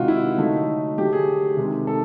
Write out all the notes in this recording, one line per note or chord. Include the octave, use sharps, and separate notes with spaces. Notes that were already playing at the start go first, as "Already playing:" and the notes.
Already playing: C3 D#3 G#3 F4 F#4
E4
D3 F#3 A3 D#4
D3 F#3 A3 G4
G#4
C3 D#3 G#3
A4